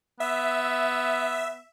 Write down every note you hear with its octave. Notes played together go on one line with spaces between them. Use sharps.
B3 E5